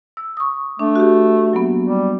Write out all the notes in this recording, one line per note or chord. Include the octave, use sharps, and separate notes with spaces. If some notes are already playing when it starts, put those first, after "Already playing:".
E6
C#6 D#6
A3 D4
F#4 G4
F#3 A#3 B3
G3